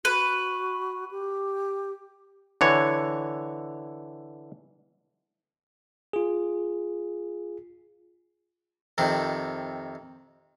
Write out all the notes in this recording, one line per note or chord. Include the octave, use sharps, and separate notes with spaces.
F#4 B4
G4
D3 E3 C#5
F4 G#4
F2 C3 D#3